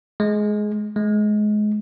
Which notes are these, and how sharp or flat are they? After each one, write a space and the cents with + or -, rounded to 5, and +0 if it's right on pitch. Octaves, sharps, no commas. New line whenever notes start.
G#3 +15
G#3 +25